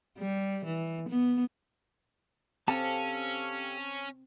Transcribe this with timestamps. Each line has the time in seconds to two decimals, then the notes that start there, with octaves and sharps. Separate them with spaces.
0.18 G3
0.65 E3
1.09 B3
2.68 C4 C#4 G4 A4 F5 A5